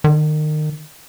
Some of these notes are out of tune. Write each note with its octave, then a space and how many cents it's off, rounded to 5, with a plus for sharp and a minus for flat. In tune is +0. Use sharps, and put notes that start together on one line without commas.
D#3 -30